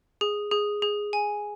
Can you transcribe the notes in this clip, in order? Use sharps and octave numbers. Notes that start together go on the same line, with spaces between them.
G#4
G#4
G#4
G#5